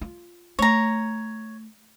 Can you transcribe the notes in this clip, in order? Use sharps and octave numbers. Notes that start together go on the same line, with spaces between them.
F4
A3 C#5 A#5